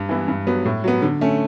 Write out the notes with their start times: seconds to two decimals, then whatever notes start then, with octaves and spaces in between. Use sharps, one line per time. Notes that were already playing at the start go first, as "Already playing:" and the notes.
Already playing: G2
0.09 E3 B3 E4
0.28 G2
0.47 F#3 B3
0.65 A2
0.84 F#3 B3
1.02 D3
1.21 A3 C#4